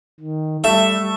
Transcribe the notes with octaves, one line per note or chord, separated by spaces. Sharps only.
D#3
G3 A3 E5